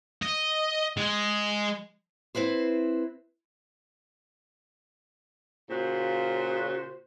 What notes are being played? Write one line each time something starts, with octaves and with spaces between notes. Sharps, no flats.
D#5
G#3
C4 E4 B4 C5
A#2 C#3 F#4 C5